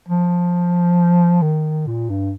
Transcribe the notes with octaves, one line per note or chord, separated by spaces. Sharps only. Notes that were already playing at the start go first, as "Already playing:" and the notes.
F3
D#3
A#2
G2